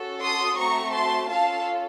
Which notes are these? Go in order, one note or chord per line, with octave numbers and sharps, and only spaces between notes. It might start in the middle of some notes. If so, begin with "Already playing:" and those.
Already playing: C#4 F#4 A4
C6 D#6
A3 C4 F#4 A#5 C#6
A5 C6
C#4 F4 A4 F5 A5